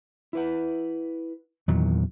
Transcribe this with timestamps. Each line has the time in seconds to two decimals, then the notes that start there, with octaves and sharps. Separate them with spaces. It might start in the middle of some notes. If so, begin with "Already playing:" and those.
0.33 E4 B4 F#5
1.68 E2 A#2 D#3 F#3